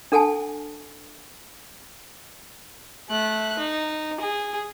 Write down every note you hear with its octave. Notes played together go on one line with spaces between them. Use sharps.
D4 A4 F#5 G#5 A5
A3 F#6
D#4
G#4